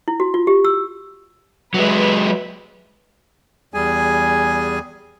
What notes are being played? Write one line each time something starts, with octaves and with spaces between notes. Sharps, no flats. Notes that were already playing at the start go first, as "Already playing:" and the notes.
E4
F#4
F4
G4
E6
F#3 G#3 B4 E5
E2 G3 G#4 G#5